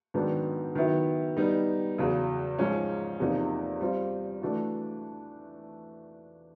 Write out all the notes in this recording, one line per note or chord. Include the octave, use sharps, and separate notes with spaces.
G#2 D#3 F#3 B3 D4
D#3 F#3 B3 E4
G3 B3 D#4
E2 C#3 F#3
G#2 F3 G#3 C#4
E2 C3 F3 A#3 D#4
G3 C4 F4
E3 A3 D4 F#4